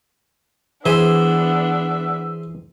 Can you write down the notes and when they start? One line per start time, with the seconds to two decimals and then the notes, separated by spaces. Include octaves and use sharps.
0.86 E3 B3 D4 G#4 C5 E5